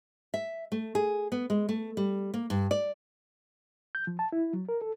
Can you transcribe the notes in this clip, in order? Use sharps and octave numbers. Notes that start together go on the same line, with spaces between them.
E5
A3
G#4
B3
G#3
A3
G3
A#3
G2
D5
G6
F3
A5
E4
F#3
A#4
A4